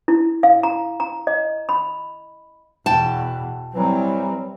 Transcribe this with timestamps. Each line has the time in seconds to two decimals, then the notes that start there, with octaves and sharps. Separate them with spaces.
0.08 E4
0.43 F5
0.63 A#5
1.00 A#5
1.27 D#5
1.69 B5
2.86 E2 B2 G5 A5
3.74 E3 F#3 G3 C4